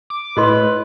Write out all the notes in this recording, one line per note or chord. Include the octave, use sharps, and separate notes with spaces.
D6
A2 A#4 B4 D#5 C6